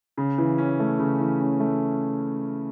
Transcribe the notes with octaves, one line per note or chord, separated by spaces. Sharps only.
C#3
E3
C#4
A3
C#3
E3
C#4
A3